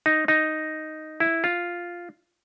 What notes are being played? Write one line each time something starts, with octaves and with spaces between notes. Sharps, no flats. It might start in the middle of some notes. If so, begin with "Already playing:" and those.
D#4
D#4
E4
F4